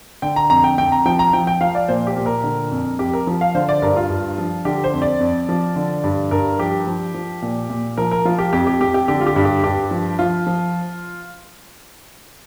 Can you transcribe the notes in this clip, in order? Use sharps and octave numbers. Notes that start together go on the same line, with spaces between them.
D3 G5
A#5
F2 A#5
G5
F2 G5
A#5
F3 G5
A#5
F3 G5
G5
F3 F5
D5
A#2 C5
G4
A#2
A#4
D3
F2
F2 G4
A#4
F3
F5
D3 C5
D5
G2 A#4
F4
G2
F3
D3 G4
C5
F2
D5
F2
F3
D3
G2
G2 A#4
F3 G4
F3
F3
A#2
A#2
F3 A#4
A#4
F3 F4
G4
F2 G4
G4
F2 G4
G4
D3 G4
F4
G4
G2
G4
G2 G4
F3
F3 F4
F3